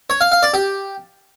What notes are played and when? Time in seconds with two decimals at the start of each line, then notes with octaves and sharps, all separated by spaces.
0.10 C#5
0.21 F5
0.32 F5
0.43 D5
0.54 G4